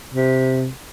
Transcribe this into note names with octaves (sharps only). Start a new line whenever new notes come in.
C3